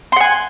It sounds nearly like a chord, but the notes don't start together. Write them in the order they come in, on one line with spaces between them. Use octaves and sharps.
C6 F#5 G#5